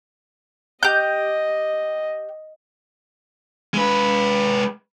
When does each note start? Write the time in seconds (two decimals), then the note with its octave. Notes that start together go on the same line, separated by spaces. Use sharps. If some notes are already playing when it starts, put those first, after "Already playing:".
0.83 G4 D#5 G6
3.74 G#3 B4